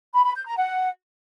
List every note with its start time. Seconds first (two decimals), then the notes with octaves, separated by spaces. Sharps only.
0.14 B5
0.24 B5
0.35 G6
0.46 A#5
0.57 F#5